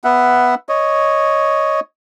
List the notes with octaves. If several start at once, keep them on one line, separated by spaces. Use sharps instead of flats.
B3 E5 F#5
C#5 D#5